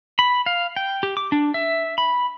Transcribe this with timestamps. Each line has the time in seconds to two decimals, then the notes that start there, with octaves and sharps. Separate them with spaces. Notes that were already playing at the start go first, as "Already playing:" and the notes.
0.19 B5
0.46 F5
0.76 G5
1.03 G4
1.17 D6
1.32 D4
1.54 E5
1.98 B5